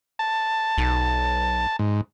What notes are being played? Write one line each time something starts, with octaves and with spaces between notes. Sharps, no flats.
A5
B1
G#2